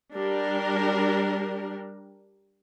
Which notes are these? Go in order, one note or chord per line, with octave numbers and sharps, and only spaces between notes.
G3 D4 G4 A#4